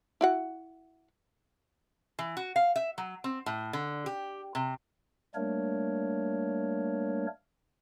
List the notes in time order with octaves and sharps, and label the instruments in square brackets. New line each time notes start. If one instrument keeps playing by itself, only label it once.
[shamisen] E4 F#4 F#5
[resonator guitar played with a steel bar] E3
F#4
F5
E5
F#3
C4
A2
D3
G4
C3
[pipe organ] G3 A3 A#3 D4 A#4 C#5